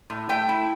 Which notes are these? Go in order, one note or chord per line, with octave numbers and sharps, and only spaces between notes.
A2
A3 G5
E4